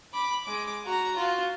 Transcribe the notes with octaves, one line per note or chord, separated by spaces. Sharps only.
B5 D6
G#3 D6
F#4 A#5
F4 F#4